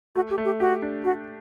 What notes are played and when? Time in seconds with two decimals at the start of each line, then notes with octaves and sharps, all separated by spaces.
0.15 A3 F#4
0.30 G4
0.38 A3
0.45 G4
0.60 F#4 G4
0.82 D4
1.04 A3 F#4